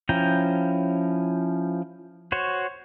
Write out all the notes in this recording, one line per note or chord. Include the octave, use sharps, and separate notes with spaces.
F3 C#4 E4 G5 A#5
F#4 C5 C#5